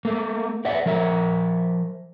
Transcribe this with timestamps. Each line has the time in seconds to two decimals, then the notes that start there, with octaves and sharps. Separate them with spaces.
0.05 A3 A#3
0.65 B4 D5 E5 F#5
0.86 F3 A#4 E5